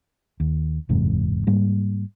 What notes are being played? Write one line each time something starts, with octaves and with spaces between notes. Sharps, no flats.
D#2
F#1 E2 G#2 C3
G#2 G3 A#3